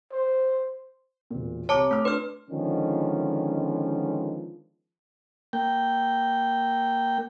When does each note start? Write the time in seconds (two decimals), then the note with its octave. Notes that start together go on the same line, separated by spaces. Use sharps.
0.12 C5
1.30 E1 A#2
1.69 C2 C#5 A5 A#5 D6 C#7
1.91 A3 D6 F6
2.05 D4 B4 C6 F6
2.50 D3 D#3 F3 G#3 B3 C#4
5.53 A#3 G5